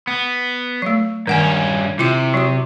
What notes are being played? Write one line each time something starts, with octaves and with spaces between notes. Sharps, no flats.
B3
F#3 A3
G2 D#3 C#4 F#5 G#5
C3 E4 F4 D6
F#3 F#4